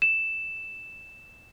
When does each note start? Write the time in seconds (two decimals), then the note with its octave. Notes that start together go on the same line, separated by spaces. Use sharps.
0.02 E7